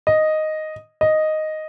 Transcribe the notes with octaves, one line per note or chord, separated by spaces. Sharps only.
D#5
D#5